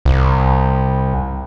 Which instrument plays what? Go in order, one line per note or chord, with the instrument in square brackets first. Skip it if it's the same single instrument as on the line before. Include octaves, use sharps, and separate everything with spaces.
[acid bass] C2